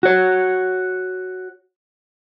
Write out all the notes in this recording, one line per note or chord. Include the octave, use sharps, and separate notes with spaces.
F#4 C#5